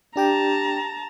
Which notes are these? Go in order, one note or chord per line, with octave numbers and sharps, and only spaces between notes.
D4 G4 G5 A5 A#5